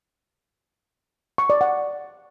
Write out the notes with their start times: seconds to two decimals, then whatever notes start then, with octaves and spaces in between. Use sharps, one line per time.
1.38 C#6
1.50 D5
1.61 F#5